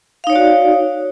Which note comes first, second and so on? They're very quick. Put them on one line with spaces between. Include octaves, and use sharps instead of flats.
F5 D#4 C#5 D5 F#4